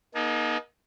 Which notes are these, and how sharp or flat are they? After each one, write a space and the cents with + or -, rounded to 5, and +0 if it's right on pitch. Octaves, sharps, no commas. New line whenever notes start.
A#3 +40 D#4 +0 A4 -45